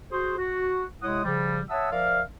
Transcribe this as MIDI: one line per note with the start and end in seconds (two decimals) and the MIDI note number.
0.12 0.33 66
0.12 0.33 68
0.12 0.33 72
0.38 0.85 66
1.02 1.23 48
1.02 1.23 56
1.02 1.23 64
1.02 1.23 73
1.02 1.23 78
1.02 1.23 87
1.24 1.61 49
1.24 1.61 53
1.24 1.61 55
1.70 1.88 73
1.70 1.88 76
1.70 1.88 78
1.70 1.88 81
1.70 1.88 87
1.70 1.88 88
1.92 2.22 53
1.92 2.22 70
1.92 2.22 74
1.92 2.22 76
1.92 2.22 77